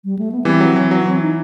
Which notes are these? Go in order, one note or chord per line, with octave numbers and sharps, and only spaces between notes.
G3
A3
B3
E3 G3 C4
F#3
E3
F#3
D#4
E3 C4
D#4